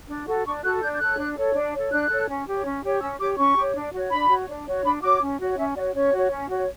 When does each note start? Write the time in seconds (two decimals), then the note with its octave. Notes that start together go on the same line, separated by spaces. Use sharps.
0.09 D4
0.27 F#4 A4
0.45 D4 C#6
0.63 F#4 A4 F#6
0.82 D4 G6
0.95 G6
1.00 A4 C#5 F#6
1.18 D4
1.37 A4 C#5
1.55 D4
1.73 A4 C#5
1.92 D4 F#6
2.10 A4 C#5
2.28 C#4
2.47 G4 C#5
2.65 C#4
2.83 G4 C#5
3.01 C#4 E6
3.19 G4 C#5 D6
3.38 C#4 C#6
3.56 G4 C#5
3.75 D4
3.93 F#4 C#5
4.11 D4 B5
4.30 F#4 C#5
4.48 D4
4.66 F#4 C#5
4.84 D4 B5
5.03 F#4 C#5 D6
5.21 C#4
5.40 F#4 C#5
5.58 C#4 E5
5.76 F#4 D5
5.80 C#5
5.94 C#4 C#5
6.12 F#4 C#5
6.31 C#4
6.49 F#4 C#5